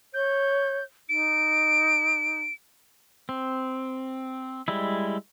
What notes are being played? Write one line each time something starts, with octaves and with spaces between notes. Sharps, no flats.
C#5 G6
D#4 D7
C4
G3 G#3 E4